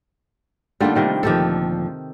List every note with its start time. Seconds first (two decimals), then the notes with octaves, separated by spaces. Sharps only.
0.80 D3 G3 A3 A#3 D#4 F4
0.95 C3 D#3 G3
1.23 D2 A#2 D#3 F3 G4 A4